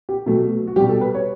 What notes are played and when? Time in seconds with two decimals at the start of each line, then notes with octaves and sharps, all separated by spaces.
0.09 G4
0.26 B2 F#3 A3
0.67 F#4
0.76 G3 G4
0.81 B2
0.89 A4
1.01 B4
1.14 C#5